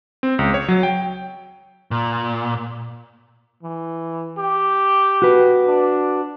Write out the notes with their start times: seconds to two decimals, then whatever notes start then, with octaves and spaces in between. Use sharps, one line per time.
0.23 C4
0.39 C#2
0.54 C#5
0.68 F#3
0.83 G5
1.91 A#2
3.63 E3
4.38 G4
5.22 F#4 B4
5.67 D4